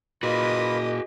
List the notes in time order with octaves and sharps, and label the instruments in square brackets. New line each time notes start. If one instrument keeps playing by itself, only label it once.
[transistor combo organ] A#2 [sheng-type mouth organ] F4 B4 B5 [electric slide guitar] F#4 G#4 [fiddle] D#5